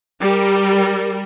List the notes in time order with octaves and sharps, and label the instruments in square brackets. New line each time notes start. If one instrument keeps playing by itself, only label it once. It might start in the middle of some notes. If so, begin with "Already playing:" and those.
[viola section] G3 A#4